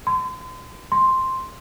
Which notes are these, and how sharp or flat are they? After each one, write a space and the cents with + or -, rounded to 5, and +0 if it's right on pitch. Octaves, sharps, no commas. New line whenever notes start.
C6 -40
C6 +0